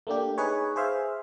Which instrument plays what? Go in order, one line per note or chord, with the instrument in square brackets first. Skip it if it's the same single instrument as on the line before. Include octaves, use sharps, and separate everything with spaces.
[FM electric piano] A3 A#3 D4 G4
D#4 G#4 B4 C#5
G#4 C5 E5 F5